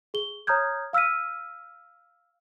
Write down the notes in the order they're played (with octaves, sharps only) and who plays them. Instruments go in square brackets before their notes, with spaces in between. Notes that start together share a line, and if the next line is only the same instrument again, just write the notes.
[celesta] G#4 G7
C#5 A#5 D#6 F6 G6 G#6
F5 E6 F6 B6 D#7